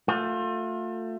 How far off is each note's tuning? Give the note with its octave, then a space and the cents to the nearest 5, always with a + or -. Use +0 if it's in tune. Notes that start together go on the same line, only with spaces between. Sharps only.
A3 +25 F4 +35